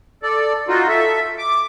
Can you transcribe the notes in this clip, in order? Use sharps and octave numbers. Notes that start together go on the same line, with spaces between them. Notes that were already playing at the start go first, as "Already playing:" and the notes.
A4 D5
D#4 F4 F#4
A4 E5
D6